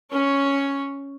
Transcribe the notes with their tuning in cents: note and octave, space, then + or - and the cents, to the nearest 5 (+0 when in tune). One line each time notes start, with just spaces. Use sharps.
C#4 +0 C#5 +5